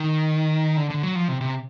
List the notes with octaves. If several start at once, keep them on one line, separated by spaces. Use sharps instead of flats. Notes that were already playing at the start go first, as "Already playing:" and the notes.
Already playing: D#3
D3
D3
F#3
F3
C3
C3